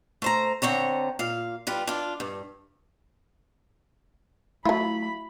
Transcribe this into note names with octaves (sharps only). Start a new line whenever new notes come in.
A3 C5 A#5
D3 C4 C#5 A#5
A#2 F5
G3 F4 B4
D4 F4
G2
F#3 A3 E4 F4 B5